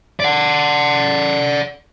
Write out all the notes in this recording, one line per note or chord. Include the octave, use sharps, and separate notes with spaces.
D5 F#5